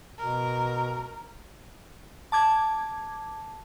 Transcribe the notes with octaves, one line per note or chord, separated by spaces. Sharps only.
B2 A#4
A5 D6 G#6